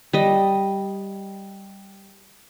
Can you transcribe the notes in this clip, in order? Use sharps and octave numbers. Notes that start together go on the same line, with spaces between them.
G3 D#5